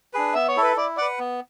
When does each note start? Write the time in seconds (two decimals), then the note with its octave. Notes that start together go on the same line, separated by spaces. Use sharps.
0.13 D4 G#4 B4
0.35 B3 E5
0.48 C#5
0.56 E4 A4
0.62 B4
0.76 E4 D5
0.98 D5 F#5
1.01 B4
1.19 B3